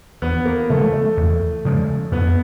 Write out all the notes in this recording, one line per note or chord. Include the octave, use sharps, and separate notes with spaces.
E2 B3
A#3
C#3 F3 G#3 A3
A3
E2
C#3 F3 G#3
F2 B3